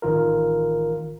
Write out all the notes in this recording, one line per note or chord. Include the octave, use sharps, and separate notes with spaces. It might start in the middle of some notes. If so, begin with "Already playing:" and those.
A1 D#3 F4 A#4